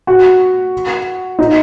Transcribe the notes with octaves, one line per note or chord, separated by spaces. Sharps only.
F#4
D#4